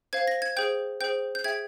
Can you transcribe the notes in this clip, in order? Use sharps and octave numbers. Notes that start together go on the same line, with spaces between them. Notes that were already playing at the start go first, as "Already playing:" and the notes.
C5 F5 G#6
A#6
G#6
G#4 C5 G5 G6
G#4 C5 G5 G6
G6
G#4 E5 G5 G#6